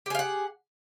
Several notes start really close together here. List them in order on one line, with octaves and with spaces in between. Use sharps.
G4 G#4 F5 F#5